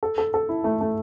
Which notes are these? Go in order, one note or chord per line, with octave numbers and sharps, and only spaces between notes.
A4
A4
A4
E4
A3
A3